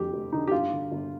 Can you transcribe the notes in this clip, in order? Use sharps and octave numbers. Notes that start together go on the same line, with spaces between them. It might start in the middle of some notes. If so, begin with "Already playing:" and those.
Already playing: F1 F2 D3 G4
F1
D3 D#4
G4
G1 F4
D3
G1